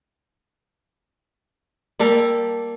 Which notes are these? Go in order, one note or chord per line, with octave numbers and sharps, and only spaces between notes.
G3 A#3 A4 F5